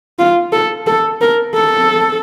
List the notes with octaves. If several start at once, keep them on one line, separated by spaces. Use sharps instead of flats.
F4
A4
A4
A#4
A4